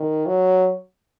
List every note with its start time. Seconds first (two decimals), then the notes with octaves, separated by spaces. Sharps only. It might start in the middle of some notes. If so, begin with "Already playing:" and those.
Already playing: D#3
0.26 F#3